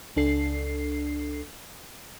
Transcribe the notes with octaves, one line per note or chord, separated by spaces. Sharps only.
C#2 D4 A4 C7